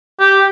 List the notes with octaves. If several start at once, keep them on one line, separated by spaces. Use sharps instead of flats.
G4